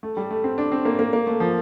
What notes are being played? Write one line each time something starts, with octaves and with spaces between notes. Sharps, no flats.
A3
G3
A3
C4
D4
C4
A#3
A#3
A#3
A3
F3